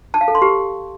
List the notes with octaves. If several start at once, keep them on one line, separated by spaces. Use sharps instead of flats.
A5
F5
A4
C6
G4